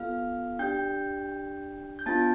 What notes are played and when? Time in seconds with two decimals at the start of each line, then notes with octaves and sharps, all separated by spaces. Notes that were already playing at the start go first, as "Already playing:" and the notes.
Already playing: B3 F4 A4 F5 F6
0.59 D4 G4 G5 G6
1.99 G6
2.06 B3 D4 F4 A5 A6